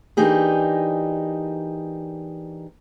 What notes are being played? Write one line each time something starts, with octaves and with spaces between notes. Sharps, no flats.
E3 A#3 D4 D#4 G4 G#4